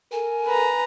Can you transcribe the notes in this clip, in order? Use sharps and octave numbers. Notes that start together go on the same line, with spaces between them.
A4 A#4 G#5
B4 A#5